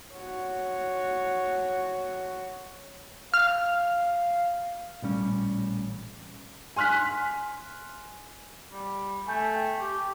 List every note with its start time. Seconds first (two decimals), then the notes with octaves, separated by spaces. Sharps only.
0.13 F#4 C#5
3.34 F5 F6
5.02 A1 A#2 G3 C#4
6.76 G#5 C6 F6 F#6 B6
8.72 G3
9.28 A3 G#5 G6
9.55 G5
9.80 G4